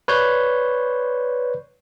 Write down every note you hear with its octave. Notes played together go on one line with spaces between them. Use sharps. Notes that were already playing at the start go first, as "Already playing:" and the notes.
B4 C#5 D5 G6